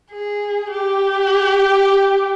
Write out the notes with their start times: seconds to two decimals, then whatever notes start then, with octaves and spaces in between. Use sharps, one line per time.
0.12 G#4
0.72 G4